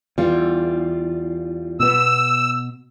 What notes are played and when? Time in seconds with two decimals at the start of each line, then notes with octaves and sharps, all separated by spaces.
0.18 E2 G3 F4
1.80 B2 B3 E6